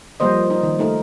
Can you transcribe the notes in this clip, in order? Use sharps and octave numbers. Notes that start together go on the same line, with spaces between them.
F3 G3 A#3 C5 D#5
D#4
D#3
A3 D#4 A#4